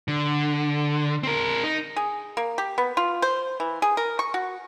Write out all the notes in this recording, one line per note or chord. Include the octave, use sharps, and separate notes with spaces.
D3
C4 A#4
D#4
G#4
A#3
G4
B3
F4
C5
E3
G#4
A#4
C#6
F#4